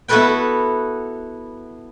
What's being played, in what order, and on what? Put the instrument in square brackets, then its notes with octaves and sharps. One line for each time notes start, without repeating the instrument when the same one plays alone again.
[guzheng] B3 E4 F#4 A4 B4 G5